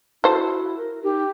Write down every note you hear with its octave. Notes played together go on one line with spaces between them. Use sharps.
E4 F#4 A4 C5
A#4
D#4 G4